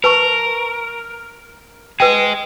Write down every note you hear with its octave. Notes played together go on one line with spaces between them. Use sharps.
A#4 B4 A5 C#6
G#4 B4 D#5 G5